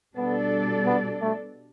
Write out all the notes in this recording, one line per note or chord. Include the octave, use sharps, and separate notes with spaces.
B2 G3 B3 D4 A4 D5
B3
A3